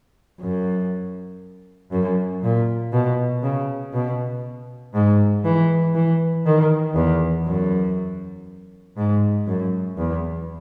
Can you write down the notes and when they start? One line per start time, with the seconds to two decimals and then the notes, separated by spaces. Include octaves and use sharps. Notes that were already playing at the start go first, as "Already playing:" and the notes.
0.41 F#2
1.91 F#2
2.43 A#2
2.93 B2
3.43 C#3
3.93 B2
4.94 G#2
5.44 E3
5.95 E3
6.46 D#3
6.95 E2
7.46 F#2
8.97 G#2
9.47 F#2
9.98 E2